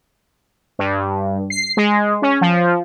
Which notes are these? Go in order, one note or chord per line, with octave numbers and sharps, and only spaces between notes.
G2
C7
G#3
C#4
F3